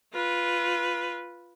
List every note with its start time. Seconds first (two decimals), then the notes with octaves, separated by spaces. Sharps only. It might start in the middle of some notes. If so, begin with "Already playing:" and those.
0.13 F4 B4